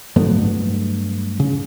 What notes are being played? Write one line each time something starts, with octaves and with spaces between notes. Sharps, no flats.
G2 F#3 A3 B3
C#3